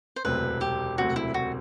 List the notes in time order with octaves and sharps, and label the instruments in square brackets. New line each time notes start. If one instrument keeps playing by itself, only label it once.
[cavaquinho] C5
[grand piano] E1 D2 C3 F#3 C4 [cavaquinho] B4
[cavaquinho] G4
[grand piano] E1 D2 C3 F#3 C4 [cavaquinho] F#4
[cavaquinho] E4
F#4